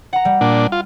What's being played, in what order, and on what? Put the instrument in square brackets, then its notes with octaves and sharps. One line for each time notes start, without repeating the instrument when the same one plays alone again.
[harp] F#5 A#5
G3
[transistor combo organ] A#2 D4
F4